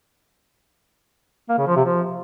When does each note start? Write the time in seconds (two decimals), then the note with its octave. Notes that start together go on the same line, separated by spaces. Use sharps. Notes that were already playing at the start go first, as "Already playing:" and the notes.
1.49 A#3
1.58 C#3
1.67 F3
1.76 C3
1.85 F3